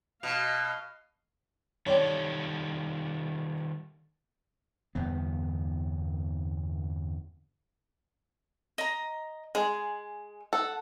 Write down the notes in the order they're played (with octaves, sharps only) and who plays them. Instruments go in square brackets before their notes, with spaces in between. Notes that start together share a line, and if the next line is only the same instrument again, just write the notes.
[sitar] B2 [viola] D#5 F5
[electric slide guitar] D#3 G3 A4 [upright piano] C#5 D5 G5
[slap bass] G1 E2 B3
[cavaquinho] D#5 A#5
[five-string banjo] G#3 [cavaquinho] G#4
[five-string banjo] A4 [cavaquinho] F#5